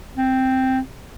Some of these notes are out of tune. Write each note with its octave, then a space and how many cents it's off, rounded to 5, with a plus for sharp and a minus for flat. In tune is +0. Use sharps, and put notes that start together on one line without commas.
C4 +0